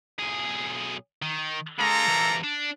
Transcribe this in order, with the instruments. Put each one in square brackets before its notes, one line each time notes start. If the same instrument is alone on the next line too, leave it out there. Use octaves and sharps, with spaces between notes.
[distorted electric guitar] B1 G#4
D#3
[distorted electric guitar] C#3 G#3 [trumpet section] A#3 A4 A#5
[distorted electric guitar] E2 C3
D4